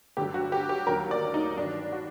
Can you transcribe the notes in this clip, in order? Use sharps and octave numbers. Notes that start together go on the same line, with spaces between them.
G2 D3 F#3 G4
F#4
G4
G4
D#2 D3 F#3 A#4
D5
D#4
G2 D#3 F#3 D4
F#4